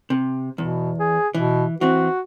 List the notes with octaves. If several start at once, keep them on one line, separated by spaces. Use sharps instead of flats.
C3
E2 B2
G#4
B2 E3
E3 C4 F#4